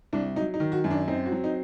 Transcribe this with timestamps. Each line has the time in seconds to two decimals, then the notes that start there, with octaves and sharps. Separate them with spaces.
0.13 C2 D4
0.36 F#3 D#4
0.54 D#4
0.60 D#3
0.72 F#4
0.84 F#2
0.90 D4
1.08 C4 D#4
1.26 F#4
1.32 F#3
1.44 D#4